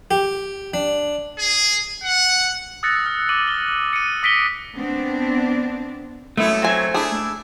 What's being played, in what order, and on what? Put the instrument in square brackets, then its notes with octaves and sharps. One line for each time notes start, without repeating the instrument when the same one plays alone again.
[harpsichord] G4
D4
[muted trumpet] G#4
F#5
[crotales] D#6 E6 F#6 A6 A#6 C#7
F6
D6 D#7 F#7
G7
C#7 D#7
D#6 A#6 B6 D7 D#7 G7
[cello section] B3 C4 D4
[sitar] F#2 B3 E4 [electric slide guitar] A3
[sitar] F#3 [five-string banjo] C4 G#5
[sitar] D4 E4 [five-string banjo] G#4